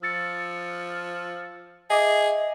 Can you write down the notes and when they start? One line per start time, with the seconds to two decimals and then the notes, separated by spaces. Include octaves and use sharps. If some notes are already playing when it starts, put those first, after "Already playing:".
0.02 F3 E6 A6 C#7
1.90 G#4 D#5 E5 D6